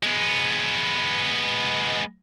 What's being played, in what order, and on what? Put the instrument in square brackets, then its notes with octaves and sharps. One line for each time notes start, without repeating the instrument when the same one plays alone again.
[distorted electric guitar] G#3 B3